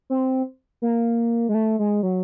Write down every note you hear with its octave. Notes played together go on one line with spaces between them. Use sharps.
C4
A#3
G#3
A3
G#3
F#3